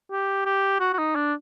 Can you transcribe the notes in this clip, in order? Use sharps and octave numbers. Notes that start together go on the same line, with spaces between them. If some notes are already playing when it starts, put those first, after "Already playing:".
G4
G4
F#4
F#4
D#4
D4